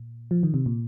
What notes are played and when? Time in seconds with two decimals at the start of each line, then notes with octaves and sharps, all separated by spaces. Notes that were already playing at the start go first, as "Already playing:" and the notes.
Already playing: A#2
0.31 F3
0.43 D#3
0.54 C3
0.66 A#2